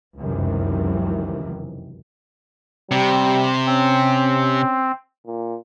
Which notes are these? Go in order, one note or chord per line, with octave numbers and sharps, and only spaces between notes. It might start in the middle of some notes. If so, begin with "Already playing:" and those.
F1 C#2 F#2 C3 D#3 E3
C3 G3
C4 C#4
A#2